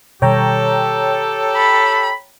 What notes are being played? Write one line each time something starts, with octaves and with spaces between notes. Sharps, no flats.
B2 D#3 G3 G4 A4 C#5 G5 A#5
B5